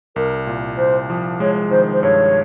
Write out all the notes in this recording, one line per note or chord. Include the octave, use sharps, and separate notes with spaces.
C2 A#4
A#2
C2 C5
F3
G#3 C#5
D#3 C5
C5
G2 C#5